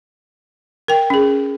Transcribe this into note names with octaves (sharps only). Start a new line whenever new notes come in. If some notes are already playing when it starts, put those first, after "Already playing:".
A#4 G5
C#4 G#4